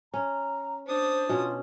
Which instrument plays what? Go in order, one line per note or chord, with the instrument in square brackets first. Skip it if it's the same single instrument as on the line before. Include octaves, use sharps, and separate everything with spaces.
[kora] C#4 [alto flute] A#5
[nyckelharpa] D4 D#6 [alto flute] C5
[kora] B2 C#4 [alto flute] F4